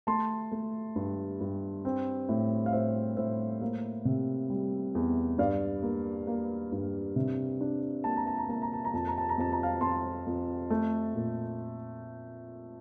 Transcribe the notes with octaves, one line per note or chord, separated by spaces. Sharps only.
A3 A5 C6
A3
G2
G2
C4
A2
F5
A2 C5 E5
A2 C5 E5
A#3
C3
G3
E2
G2 D5 F5
A#3
A#3
G2
C3
D4
A#3 A5
A#5
A5
A#5
A#3 A5
A#5
A5
A#5
F2 A5
A#5
A5
A#5
F2 A5
A#5
F5 A5
F2 A5 C6
F2
A3
A#2